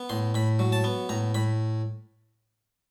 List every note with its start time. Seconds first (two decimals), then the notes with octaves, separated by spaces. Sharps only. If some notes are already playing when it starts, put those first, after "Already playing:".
Already playing: B3
0.09 A2 C6
0.34 A2 B5
0.59 F#3
0.72 A5
0.84 B3
1.09 A2 A#5
1.35 A2 B5